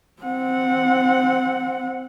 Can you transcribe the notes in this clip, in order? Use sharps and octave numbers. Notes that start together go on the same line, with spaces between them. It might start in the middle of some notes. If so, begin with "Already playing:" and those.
C4 F#5